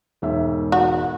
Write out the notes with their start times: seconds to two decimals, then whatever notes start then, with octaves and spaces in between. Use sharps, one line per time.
0.22 E1 G#2 E5
0.72 F#4